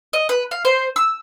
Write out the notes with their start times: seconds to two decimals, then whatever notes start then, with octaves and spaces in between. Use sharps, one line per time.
0.13 D#5
0.29 B4
0.51 F5
0.65 C5
0.96 E6